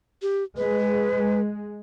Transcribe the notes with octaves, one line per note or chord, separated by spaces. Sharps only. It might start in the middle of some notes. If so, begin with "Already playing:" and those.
G4
G#3 B4